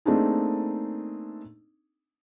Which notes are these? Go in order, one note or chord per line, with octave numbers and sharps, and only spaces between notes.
A3 A#3 C4 D4 D#4 G#4